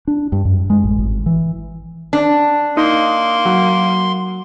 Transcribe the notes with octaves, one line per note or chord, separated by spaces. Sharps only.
D4
G2
F#2
G#3
A1
G#1
E3
D4
A#3 D#4 C6
F#3